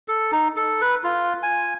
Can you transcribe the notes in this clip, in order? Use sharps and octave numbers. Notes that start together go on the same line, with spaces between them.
A4
D#4
A4
B4
F4
G#5